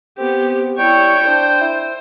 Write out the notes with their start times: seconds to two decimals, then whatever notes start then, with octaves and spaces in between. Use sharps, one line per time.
0.18 B3 C4 G4
0.78 G3 E4 C#5 G5
1.27 D4 C5
1.61 E4